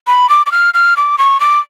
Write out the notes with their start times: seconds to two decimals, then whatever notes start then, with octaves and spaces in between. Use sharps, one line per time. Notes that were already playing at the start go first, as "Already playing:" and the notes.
0.07 B5
0.29 D6
0.46 D6
0.52 F6
0.74 F6
0.97 D6
1.18 C#6
1.40 D6